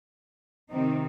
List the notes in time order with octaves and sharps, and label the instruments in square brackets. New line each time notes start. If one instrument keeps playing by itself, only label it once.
[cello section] C3 D#3 C4 D#4